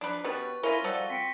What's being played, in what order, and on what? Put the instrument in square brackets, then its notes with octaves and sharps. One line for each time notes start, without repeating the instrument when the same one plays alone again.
[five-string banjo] F3 [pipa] D4 B4
[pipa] B2 [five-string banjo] C#4 G4 B4 [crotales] C#6 A6
[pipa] C#4 F4 [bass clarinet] E4 [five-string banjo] A#4 [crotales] A#6 D#7 G7
[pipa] F3 F#4 A4 [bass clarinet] G3 [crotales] G7
[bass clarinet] C4 [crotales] B6 C#7 D7